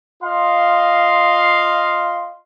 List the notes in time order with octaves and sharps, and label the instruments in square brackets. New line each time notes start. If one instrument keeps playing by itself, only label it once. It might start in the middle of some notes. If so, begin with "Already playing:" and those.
[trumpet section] F4 D#5 F5 C6